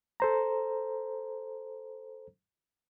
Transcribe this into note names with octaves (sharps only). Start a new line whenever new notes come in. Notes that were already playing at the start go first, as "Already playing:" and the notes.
A4 C5 A#5